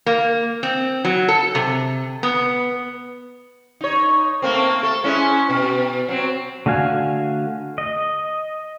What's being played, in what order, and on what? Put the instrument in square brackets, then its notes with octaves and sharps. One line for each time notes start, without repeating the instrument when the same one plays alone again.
[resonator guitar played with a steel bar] A#3
C4
F#3
A4
C3
B3
[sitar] D#4 C#5
A3 A#3 C4
A4
G#3 C#4 E4
B2
F#3 C4
[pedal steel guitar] D3 A3 F#4 F5 G#5
D#5